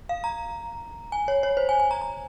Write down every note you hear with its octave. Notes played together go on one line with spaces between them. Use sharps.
F5
A#5
G#5
C#5
C#5
C5
G#5
G#5
A#5
A#5